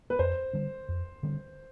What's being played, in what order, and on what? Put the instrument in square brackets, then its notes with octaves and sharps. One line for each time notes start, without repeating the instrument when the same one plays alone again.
[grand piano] B4
[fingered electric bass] F2 [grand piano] C5
[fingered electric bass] D3 G3 C4
F2
D3 G3 C4